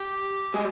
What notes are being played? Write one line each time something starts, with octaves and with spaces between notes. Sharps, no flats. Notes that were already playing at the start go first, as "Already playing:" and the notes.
Already playing: G4
G#3